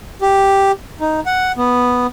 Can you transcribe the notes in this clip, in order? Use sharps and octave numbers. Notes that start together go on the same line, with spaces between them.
G4
D#4
F#5
B3